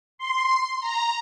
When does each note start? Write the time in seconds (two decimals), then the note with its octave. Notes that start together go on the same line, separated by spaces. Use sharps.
0.18 C6
0.81 A#5